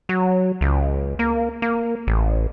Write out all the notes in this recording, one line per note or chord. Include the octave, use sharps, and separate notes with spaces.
F#3
C#2
A#3
A#3
A1